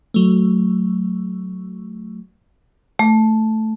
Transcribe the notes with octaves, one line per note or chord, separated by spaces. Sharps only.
F#3 A3
A3